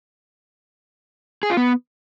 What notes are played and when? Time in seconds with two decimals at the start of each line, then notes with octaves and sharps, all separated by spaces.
1.43 G#4
1.50 F4
1.57 B3